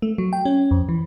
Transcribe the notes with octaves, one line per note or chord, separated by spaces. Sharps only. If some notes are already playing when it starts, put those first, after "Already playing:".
A3
F#3
G5
C#4
F2
E3